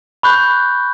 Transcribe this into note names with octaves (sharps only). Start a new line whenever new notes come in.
B5 C#6 F#6 G6